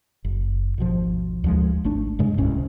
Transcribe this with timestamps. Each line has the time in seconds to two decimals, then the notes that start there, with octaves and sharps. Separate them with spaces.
0.24 F#1
0.78 G#1 D#2 B2 F3
1.44 D2 F3 G#3
1.84 G#1 A3 D4
2.19 G2 C#3 G#3
2.38 D1 C2 A2 C#4